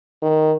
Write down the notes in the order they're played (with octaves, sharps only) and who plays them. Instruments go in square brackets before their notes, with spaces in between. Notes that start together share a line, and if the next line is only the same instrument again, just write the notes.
[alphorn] D#3